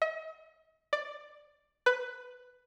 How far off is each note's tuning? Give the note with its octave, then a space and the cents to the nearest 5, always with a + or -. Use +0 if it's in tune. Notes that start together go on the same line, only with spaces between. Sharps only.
D#5 +45
D5 +10
B4 +10